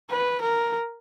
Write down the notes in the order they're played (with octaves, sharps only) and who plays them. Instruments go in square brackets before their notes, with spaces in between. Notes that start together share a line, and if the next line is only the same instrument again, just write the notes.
[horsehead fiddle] B4
A#4